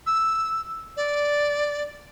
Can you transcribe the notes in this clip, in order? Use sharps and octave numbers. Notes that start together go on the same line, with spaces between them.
E6
D5